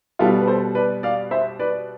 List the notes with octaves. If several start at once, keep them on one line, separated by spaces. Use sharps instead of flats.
B2 G3 B3 F4 A4
B4
A4 C5
B4 D5
D5 F5
C5 E5
B4 D5